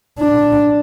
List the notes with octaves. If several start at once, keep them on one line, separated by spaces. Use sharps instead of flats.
D4